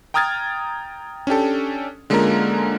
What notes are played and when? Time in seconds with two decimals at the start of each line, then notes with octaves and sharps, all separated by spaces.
0.14 G5 A#5 D#6 F6 G#6 A6
1.27 C#4 D4 G4 A4
2.10 D3 G#3 A#3 C#4 F4 A#4